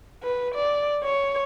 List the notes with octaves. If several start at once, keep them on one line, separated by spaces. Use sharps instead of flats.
B4
D5
C#5